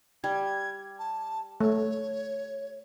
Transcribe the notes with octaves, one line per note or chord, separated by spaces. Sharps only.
G3 G#6
A5
A3 C#5